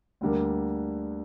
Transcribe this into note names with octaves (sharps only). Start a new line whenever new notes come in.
D2 D3 G3 A#3